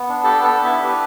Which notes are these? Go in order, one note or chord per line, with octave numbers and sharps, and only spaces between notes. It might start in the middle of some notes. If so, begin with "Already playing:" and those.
Already playing: B3
D4
G4 A4 A5
B3
A4 A5
B3
D4 E4 E5
G4 B4